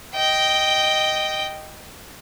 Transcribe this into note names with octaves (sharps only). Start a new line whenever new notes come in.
D#5 G5